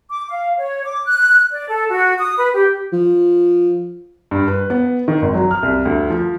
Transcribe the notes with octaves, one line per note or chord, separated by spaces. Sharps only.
D6
F5
C#5
D6
F#6
D5
A4
F#4
D#6
B4
G4
F3
G2
B4
B3
D#3
G#1
F#3
F6
C2
D2
F3